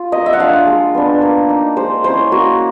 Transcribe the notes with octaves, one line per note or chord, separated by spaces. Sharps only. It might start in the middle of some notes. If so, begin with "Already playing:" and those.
Already playing: F4
A#3 D#5
E5
F#5
D4 F4 F5
G#3
B3 D4
A#3
D#4
G#3 C5
C#4 E4 C5
A#3 F#4